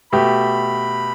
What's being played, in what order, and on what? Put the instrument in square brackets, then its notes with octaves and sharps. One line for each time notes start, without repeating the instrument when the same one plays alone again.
[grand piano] B2 A3 G4 [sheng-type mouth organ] B5